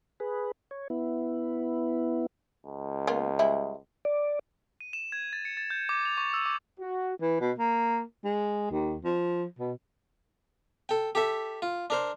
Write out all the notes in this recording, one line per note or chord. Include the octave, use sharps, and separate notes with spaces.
G#4 B4
C#5
B3 E4
C#2
A#3 B3 F4
G3 G#3 E4
D5
D#7
E7
G#6
A6
C#7
A6
G6
D6
F7
C#6
E6
D6
F#4
E3
B2
A#3
G#3
D#2
F3
B2
A4 G5
G4 A4 E5
F4
D4 A#4 C5